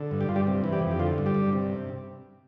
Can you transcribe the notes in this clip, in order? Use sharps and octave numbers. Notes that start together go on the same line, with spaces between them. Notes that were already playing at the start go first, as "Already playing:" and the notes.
Already playing: D3
G2
G4
G2 F4
G3 G4
C3
E3
G3 G4
F2
G4
D3 F4
G2
G3 G4
G2
C3